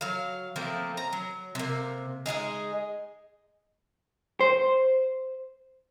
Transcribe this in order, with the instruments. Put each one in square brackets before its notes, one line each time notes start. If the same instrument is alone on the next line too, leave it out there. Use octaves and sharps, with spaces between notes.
[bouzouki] F#3 F5
F3 A3 A#3 C4
A#5
F#3
C3 A#3
G#3 D#4 F4 G#4
[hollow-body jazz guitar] C5